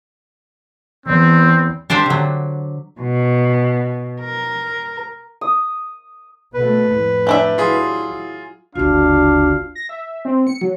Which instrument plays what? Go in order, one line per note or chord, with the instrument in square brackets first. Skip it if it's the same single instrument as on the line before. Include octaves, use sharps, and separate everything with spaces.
[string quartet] E2 [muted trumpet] C4
[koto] D4 G4 C5 D5 E5
D3 F#3
[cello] B2
A#4
[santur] D#6
[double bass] B2 A3 [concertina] B4
[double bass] F2 A2
[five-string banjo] G3 D4 E5
[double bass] F#3 E4 [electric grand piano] F4 G#4
[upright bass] F#1 D2 [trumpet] D4 [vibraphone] F4 F#4 [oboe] F5
[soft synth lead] A#6
E5
C4
C#7
F#3